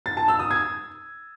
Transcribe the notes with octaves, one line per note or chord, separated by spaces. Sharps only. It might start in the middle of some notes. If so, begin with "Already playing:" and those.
A6
A5
E6
D#6
G#6